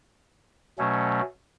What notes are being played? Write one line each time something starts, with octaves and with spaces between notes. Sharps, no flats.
B2 F#3 A3 C#4